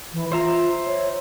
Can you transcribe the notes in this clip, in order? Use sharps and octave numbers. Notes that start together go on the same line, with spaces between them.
E3
F4 C5 E5 A#5
C#5